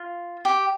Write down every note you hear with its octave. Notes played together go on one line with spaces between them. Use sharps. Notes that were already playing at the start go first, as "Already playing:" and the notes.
Already playing: F4
G4